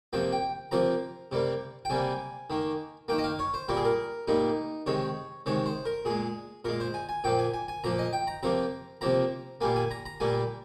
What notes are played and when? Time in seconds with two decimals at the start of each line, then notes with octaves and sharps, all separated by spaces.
0.13 C3 F3 A#3 G5
0.32 G5
0.71 C3 F3 A#3 A#5
1.32 C3 G3 A#3
1.85 G5
1.90 C3 G3 A#3 G#5
2.50 D#3 A#3
3.08 D#3 A#3 G5
3.18 D#5
3.24 F5
3.39 C#5
3.54 C5
3.68 A#2 G3 A#3 A#4
3.77 G#4
3.85 A#4
4.28 A#2 G3 A#3 D#4
4.86 C3 D#3 G#3 C#5
5.46 C3 D#3 G#3 C#5
5.66 C5
5.85 A#4
6.05 A#2 G#3 G#4
6.65 A#2 G#3 A#4
6.80 C5
6.94 G#5
7.09 G#5
7.24 A#2 F3 A#3 G5
7.39 G#5
7.54 G#5
7.68 G#5
7.84 A#2 F3 A#3 A#5
7.99 D#5
8.13 G5
8.27 A#5
8.43 C3 F3 A#3 A#5
9.01 C3 F3 A#3 A#5
9.61 A#2 G3 A#3 G#5
9.76 G#5
9.91 A#5
10.06 A#5
10.20 A#2 G3 A#3 G#5